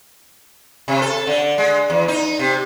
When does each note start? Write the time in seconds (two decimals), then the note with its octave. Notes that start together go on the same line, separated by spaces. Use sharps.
0.88 C3
1.02 A4
1.27 D3
1.58 G#3
1.90 E2
2.08 D#4
2.39 C3